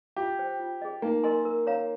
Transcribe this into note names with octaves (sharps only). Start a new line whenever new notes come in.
F4 G4
C5 G5
F4
G#4 D#5
A#3 D#4
A#4 D#5 G#5 C6
A#4
C#5 F5 A#5